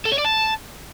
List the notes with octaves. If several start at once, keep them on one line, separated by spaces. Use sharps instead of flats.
A4
C#5
D5
A5